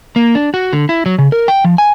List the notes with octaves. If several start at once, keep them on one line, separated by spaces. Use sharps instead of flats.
A#3
D4
F#4
D3
E4
F#3
C#3
A#4
G5
F3
G#5